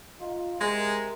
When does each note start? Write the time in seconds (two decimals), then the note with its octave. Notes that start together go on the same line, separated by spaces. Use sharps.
0.21 D#4 F4
0.61 C3 G#3 A#4